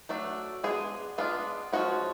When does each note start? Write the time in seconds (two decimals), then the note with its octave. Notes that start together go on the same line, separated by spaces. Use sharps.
0.09 F#3 A3 D4
0.64 G#3 B3 D4 G#4
1.18 G#3 B3 D4 F4
1.72 F3 G#3 C#4 F#4